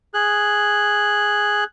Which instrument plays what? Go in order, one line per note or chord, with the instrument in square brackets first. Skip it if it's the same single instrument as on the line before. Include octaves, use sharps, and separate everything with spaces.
[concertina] G#4 F#6